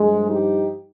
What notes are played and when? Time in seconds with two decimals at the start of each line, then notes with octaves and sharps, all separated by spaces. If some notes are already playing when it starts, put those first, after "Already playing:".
Already playing: G2 F3 G#3
0.30 D#4 G4